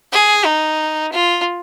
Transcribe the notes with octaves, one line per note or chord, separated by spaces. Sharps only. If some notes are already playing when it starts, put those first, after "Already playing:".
G#4
D#4
F4